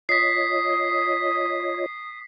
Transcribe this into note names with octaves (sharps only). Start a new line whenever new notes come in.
F4 C#5 D#5 D#6 B6 C7